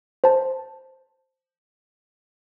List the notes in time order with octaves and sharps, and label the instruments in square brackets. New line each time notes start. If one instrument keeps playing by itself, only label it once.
[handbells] C5 A5